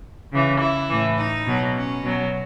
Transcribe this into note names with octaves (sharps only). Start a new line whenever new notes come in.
C#3 E3
E4
A2 E3
D#4
B2 F#3
C#4
B2 F#3